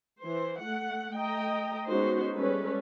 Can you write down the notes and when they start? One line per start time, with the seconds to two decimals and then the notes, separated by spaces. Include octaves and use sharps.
0.21 E3 C5
0.60 A3 F#5
1.15 A3 D#5 G5 A#5
1.88 G#3 B3 C#4 D#4 F#4 C5
2.34 G3 G#3 C#4 A4 B4